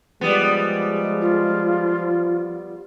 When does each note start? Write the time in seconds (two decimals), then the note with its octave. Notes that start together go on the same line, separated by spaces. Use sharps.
0.21 F3 G3 G#3 B3
1.22 F4